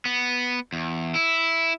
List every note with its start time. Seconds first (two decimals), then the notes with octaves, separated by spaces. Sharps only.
0.05 B3
0.73 E2
1.15 E4